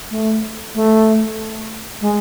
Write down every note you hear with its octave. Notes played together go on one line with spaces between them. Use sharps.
A3
A3
G#3